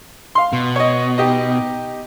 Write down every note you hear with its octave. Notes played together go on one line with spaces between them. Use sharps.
F5 C6
B2
C#5 D#5
D#4 G4 D#5